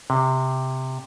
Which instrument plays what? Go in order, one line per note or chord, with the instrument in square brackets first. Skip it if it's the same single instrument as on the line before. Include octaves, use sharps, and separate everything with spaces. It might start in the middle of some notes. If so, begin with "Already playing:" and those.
[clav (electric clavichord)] C3